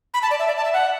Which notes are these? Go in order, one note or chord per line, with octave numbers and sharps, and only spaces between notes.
B5
A5
D5
E5
D5
A5
E5
F#5